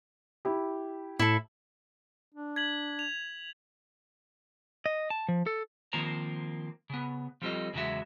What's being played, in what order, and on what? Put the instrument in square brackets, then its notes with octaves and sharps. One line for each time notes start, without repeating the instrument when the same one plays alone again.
[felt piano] E4 G4
[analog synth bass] A2 [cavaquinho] E4 A4
[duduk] D4
[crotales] G#6 B6 F#7
F7
[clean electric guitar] D#5
A5
F3
A4
[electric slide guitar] D#3 F3 A#3 C4 A#5
C#3 B3
F3 G3 C4 F4 A4 D#5
E2 C#3 F#3 G#3 F#4 E5